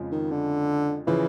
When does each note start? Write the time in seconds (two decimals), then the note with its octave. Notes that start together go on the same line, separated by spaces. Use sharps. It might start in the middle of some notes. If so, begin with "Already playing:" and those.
Already playing: F2 C#3 F3 G#3
0.12 D#3
0.31 D3
1.07 C#3 E3 F3